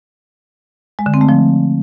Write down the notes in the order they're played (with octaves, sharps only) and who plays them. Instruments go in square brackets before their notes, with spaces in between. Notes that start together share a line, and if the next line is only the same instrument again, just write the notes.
[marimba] G#3
D3
C4
A3
F3